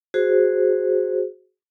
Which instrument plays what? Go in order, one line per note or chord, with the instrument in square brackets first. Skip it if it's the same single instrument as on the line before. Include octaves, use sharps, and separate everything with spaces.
[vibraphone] F#4 G#4 C5